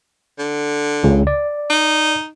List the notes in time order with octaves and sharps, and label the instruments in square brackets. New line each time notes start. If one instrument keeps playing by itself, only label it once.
[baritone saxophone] D3
[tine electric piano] C#2 C#3
D5
[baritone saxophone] D#4